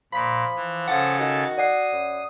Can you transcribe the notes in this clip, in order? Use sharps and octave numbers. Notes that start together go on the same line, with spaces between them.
A#2 F3 B5
E3
C#3 F3 A4 F#5 A6
D#3 F#4
D5 F#5 D#6 C7
F#2